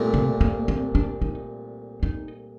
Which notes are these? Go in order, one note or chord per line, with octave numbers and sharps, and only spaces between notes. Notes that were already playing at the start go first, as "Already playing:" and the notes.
Already playing: C2 A#2 A3
C3
A#3
C4
D4
D#4
D#4